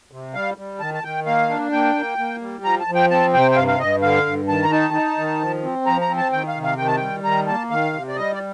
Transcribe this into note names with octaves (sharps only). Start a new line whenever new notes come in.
C3
G3 F5
G3
D#3 A5
A5
D#3 G5
A#3 F5
D4
A#3 G5
A#3
A#3
G3
F3 A#5
A5
F3
G5
C4 A5
C3 G5
G5
G2 F5
F5
G2 D#5
D3 F5
G2
D#3 A5
A#5
D#4 A5
D#4
D#3
F3
C4
F3 A#5
A#5
C4
A5
D#3 G5
F5
C3
F5
D#3 G5
A5
G3 G5
D#3 A#5
A#3 A5
D#3 F5
C3
D5
G3 D#5
D5